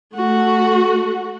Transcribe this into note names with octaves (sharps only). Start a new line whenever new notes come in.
A3 F#4